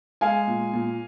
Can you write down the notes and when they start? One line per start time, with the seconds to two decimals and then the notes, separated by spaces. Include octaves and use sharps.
0.21 G#3 F5 G#5
0.47 A#2
0.73 A#2